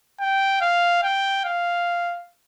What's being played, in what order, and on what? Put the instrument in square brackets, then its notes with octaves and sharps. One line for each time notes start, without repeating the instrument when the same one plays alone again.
[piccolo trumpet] G5
F5
G5
F5